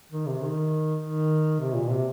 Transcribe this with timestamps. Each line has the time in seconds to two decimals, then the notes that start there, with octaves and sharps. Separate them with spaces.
0.12 D#3
0.27 C3
0.42 D#3
1.02 D#3
1.60 C3
1.75 A#2
1.91 C3